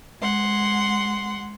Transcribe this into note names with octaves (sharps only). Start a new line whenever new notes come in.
G#3 F#5 C6